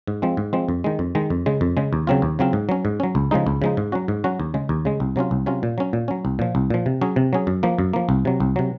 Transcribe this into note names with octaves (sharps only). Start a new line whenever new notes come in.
G#2
F3 G#3 C4
G#2
F3 G#3 C4
F2
D#3 G#3
F2
D#3 G#3
F2
C#3 G#3
F2
C#3 G#3
D#2
C#3 F#3 C4 F4
D#2
C#3 F#3 C4 F4
G#2
F#3 C#4
G#2
F#3 C#4
C#2
C#3 F3 G#3 D#4
C#2
C#3 F3 G#3 D#4
G#2
F#3 C#4 F#4
G#2
F#3 C#4 F#4
D#2
C#3 G#3
D#2
C#3 G#3
C2
C3 F#3 C#4 F4
C2
C3 F#3 C#4 F4
A#2
F#3 C#4
A#2
F#3 C#4
C2
A#2 F3
C2
A#2 F3
C3
F#3 C#4 G#4
C3
F#3 C#4 G#4
F#2
F3 A#3
F#2
F3 A#3
C2
C3 F#3
C2
C3 F#3